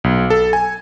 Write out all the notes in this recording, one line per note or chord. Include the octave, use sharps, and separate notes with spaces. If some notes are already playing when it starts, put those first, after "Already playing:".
B1
A4
G#5